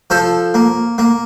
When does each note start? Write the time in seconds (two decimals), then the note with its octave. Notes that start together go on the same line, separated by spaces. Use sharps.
0.10 F3 A4 C5
0.54 A#3
0.98 A#3